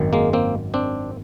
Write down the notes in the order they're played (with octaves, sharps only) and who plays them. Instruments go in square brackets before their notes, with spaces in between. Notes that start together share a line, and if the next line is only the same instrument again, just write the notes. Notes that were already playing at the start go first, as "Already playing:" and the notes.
Already playing: [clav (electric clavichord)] G#1 F#2 D#3
G#3 A#3
A#3 C4
C4 D4